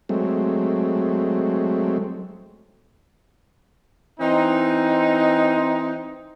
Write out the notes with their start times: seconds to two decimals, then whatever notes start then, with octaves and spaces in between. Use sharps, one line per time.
0.09 F#3 G#3 A3 C4
4.20 E3 C4 D#4